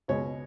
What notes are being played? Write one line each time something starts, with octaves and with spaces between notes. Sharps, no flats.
C#2 B2 G#3 C#5